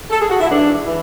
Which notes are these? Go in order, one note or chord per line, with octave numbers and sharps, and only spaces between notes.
A4
G#4
F#4
E4
G#2 E3 D4
E3